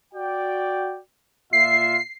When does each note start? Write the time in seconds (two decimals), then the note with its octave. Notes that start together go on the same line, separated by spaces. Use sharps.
0.14 F#4 D5 G5
1.53 A#2 F4 E5 C7